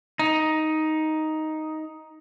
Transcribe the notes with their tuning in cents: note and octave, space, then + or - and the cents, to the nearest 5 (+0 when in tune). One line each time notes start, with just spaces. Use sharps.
D#4 +5